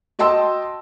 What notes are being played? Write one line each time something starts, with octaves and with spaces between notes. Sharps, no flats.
F#4 D#5 G5 A5 C6 E6